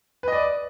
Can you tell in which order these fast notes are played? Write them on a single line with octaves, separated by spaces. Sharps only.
B4 D#5 D5